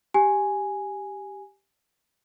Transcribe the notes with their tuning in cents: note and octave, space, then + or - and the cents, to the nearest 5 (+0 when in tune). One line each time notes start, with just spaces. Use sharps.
G4 +0 G#5 +0